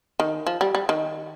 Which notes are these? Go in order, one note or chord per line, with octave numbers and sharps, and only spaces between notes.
D#3
F3
G3
G3
D#3